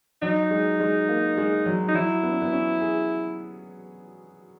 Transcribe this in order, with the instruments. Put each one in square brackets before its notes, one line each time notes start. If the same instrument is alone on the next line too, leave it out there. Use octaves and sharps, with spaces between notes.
[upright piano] F#3 [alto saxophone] D#4
[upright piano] G#3
G#3
A#3
G#3
F#3
[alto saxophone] D#4
[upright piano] F#3 [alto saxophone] E4
[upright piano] B3
C#4
B3
C#4
G#4